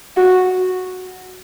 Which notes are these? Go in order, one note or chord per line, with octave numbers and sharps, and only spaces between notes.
F#4